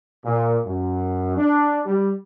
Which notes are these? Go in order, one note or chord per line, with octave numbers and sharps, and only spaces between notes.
A#2
F#2
D4
G3